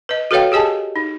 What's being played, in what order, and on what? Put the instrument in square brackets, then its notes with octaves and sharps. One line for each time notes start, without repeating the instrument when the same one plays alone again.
[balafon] B4 D#5
F#4 A4 B4 C#5 F5 G5
G4 G#4 D#5 G#5 A5
D#4